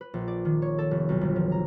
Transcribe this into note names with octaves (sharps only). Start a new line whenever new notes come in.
B4
A#1
D5
D#3
C#5
A4
F1
B1
G1
F3
A#5